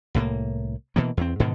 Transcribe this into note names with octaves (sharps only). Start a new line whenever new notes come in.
C2 A2 G#3 A#3
B2 E3 A#3
E2 C4
G#2 B2 D3 D#3